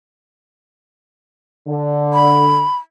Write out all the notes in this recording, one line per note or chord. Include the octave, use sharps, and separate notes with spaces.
D3
B5